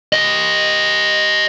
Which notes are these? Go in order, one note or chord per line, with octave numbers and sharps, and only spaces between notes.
G4 D#5